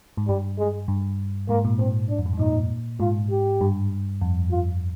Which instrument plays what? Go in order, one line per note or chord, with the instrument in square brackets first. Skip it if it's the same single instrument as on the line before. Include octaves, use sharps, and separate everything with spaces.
[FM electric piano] G#2
[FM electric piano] G2 [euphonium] G3
[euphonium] G#3
[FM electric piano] G2
[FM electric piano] G#2 [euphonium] A#3
[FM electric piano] A#2
[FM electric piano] G#2 [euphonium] C4
[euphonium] D4
[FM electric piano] F2
G2
G#2
[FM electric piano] A#2 [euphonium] D#4
[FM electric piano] G#2 [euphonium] F4
[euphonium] G4
[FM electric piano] G2
F2
[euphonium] F4